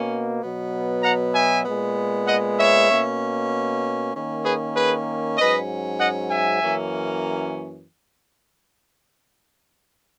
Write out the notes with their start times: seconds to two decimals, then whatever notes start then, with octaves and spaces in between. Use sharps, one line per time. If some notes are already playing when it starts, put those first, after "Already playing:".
Already playing: B2 A#3 C#4
0.42 B2 F#3 B3
1.03 F#5 A#5
1.34 E5 G#5
1.65 A#2 G#3 B3
2.27 D#5 F#5
2.59 C#5 E5
2.90 B2 A#3 C#4
4.14 D#3 A#3 C#4
4.45 G#4 B4
4.76 G#4 B4
5.38 G#2 F#3 C#4 B4 D#5
6.00 D#5 F#5
6.31 E5 G#5
6.63 F#2 E3 A#3 C#4